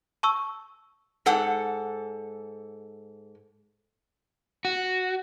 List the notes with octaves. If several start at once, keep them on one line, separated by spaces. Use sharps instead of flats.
A5 C#6 E6
G#2 A4 F#5
F#4